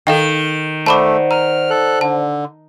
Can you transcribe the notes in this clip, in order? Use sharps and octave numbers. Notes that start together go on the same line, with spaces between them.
D#3 A4 F5 G5
A3 C5 D5 F#5 A5 B5 D6
A#5 F6
A4 F#6
D3 A5